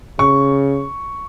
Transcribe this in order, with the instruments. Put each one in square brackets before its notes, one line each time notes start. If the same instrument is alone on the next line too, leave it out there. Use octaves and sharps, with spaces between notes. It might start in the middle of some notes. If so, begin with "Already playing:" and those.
[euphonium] C#3 [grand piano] C#6